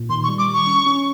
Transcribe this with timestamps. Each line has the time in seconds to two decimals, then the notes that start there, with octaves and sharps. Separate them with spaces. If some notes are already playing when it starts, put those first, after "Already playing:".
Already playing: A#2
0.09 D#3 C6
0.24 C#6
0.28 G3
0.38 D6
0.48 D#3
0.54 C#6
0.67 C#4
0.86 C#4